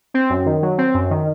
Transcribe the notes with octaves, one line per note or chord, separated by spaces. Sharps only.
C4
F#2
D#3
F#3
C4
F#2
D#3